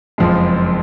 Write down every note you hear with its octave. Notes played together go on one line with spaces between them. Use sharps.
F#1 F2 F3 G#3